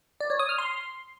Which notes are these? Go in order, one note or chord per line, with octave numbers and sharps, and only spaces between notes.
D5
C#5
D#6
F6
C6